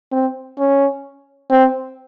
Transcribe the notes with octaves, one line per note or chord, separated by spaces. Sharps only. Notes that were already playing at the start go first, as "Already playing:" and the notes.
C4
C#4
C4